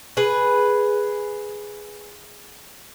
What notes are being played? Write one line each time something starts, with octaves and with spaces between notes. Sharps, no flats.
G#4 B4